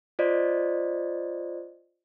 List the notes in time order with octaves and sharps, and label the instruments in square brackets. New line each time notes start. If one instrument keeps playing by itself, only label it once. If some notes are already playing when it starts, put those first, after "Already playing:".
[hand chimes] F4 C5 D5 D#5